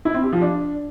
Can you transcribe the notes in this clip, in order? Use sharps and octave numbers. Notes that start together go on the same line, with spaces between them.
E4
C4
G4
F3
D4